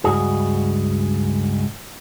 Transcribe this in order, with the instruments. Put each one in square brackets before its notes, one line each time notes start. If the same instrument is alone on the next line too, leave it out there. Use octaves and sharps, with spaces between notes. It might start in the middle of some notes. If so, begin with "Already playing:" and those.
[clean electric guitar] C#2 G2 F#4 G#4